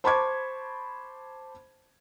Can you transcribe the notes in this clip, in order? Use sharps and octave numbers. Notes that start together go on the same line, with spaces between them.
C5 A5 B5 C#6 D6 G#6